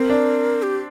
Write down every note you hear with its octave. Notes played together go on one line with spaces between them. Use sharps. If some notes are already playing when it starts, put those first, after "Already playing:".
Already playing: C4 A#4
D4
G4